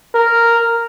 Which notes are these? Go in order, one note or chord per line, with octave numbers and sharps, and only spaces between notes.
A#4